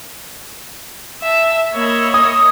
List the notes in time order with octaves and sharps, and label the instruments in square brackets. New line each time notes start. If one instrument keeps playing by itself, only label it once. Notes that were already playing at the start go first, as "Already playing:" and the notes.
[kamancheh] E5 A5
[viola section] A#3 E5 B5 [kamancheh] C#5 D#5
[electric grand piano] D#6